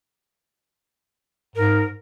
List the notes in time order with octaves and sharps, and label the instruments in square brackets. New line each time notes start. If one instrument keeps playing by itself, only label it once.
[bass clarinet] G#2 [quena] A#4